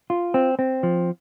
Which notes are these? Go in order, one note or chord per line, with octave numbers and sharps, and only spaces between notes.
F4
C4
C4
F3